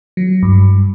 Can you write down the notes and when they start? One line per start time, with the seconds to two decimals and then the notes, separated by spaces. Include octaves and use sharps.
0.17 F#3
0.43 G2